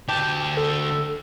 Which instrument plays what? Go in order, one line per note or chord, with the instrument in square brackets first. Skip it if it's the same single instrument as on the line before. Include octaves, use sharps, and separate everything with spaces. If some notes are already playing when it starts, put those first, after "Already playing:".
[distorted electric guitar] D2 A5 [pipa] G4
[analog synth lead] A4